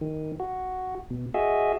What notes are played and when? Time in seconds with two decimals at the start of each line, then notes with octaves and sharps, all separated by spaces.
0.01 D#3
0.40 F#4
1.10 B2
1.34 F#4 G#4 D#5 E5